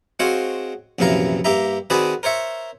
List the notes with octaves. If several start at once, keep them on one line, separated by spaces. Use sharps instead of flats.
G#3 C4 F#4 C5 C#5 F5
A#1 F#2 C3 E3 F5 A#5
G2 A#3 G4 E5 A#5
D#3 C4 F#4 G#4 B4 D5
A#4 C5 C#5 E5